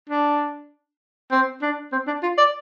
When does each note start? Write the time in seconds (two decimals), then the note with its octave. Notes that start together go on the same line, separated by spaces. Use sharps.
0.09 D4
1.31 C4
1.62 D4
1.92 C4
2.07 D4
2.23 F4
2.38 D5